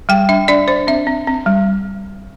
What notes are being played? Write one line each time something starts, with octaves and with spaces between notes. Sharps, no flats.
G3 G5
D4 E5
D4 D5
D4 C5
C4 E5
C4
C4
G3